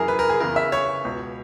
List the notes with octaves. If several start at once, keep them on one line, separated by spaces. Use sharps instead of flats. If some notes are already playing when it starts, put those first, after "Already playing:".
Already playing: F#2 E3 G#4 A#4
B4
A#4
G#4
E2 C#3 E3 A#4
E5
C#5
C#2 B2